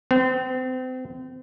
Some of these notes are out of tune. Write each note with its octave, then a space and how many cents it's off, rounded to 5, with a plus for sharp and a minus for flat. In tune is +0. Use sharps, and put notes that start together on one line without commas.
C4 -35